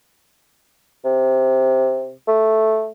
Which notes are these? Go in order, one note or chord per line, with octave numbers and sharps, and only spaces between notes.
C3
A3